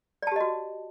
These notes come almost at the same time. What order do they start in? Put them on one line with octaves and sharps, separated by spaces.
D5 A5 G4 D#5 F#4